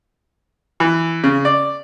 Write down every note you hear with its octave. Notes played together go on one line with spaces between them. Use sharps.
E3
C#3
D5